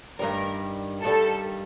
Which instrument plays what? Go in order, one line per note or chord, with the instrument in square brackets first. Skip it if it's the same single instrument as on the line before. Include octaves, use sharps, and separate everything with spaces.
[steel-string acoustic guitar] G2 D#3 G3 [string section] A#4
[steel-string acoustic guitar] G2 D#3 G3 [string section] A4